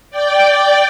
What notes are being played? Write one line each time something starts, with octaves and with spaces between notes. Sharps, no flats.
D5 G5